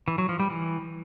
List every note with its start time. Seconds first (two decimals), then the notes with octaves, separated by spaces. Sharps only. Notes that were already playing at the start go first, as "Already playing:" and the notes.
0.08 E3
0.18 F#3
0.29 F3
0.40 G3
0.50 E3